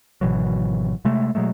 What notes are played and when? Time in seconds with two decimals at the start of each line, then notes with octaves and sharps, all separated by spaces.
0.21 G#1 B2 E3 F#3
1.05 C3 G#3 A3
1.35 B2 F#3 G#3 A3